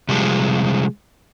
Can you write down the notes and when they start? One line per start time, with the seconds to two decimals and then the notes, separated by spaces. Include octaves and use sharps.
0.09 C3 F3 G3 G#3